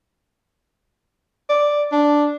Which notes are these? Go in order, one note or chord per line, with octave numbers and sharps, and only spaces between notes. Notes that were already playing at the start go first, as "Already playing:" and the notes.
D5
D4